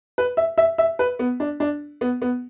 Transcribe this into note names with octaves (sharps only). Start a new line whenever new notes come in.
B4
E5
E5
E5
B4
B3
D4
D4
B3
B3